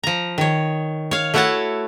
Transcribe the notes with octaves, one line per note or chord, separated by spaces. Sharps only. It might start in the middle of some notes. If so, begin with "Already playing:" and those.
F3 A#5
D#3 C#5
C#5 F5
A3 E4 F#4 C#5 F#5 A5